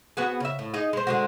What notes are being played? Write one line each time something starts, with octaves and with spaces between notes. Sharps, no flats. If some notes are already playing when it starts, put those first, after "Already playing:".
B3 F#4 G#4
C#3 E5
A2
D#4 G#4 D#5
G#3 C5
D3 G#3 F#4